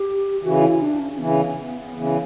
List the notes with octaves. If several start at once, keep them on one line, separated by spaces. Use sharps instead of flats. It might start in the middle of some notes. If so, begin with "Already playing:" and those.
Already playing: G4
C#3 E3 F#4
E4
D4
C#4
C#3 E3 B3
C#3 E3